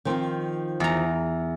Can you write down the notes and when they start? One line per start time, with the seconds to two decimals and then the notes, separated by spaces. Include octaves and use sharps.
0.05 D#3 F3 C4
0.80 E2 A#5